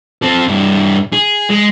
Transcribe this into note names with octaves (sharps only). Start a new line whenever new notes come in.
C4 A4
G2 E4
G#4
G#3